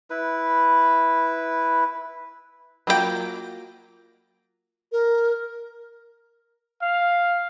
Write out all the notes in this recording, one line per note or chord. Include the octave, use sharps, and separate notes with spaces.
E4 B4
F#3 A#3 F4 F#4 G5
A#4
F5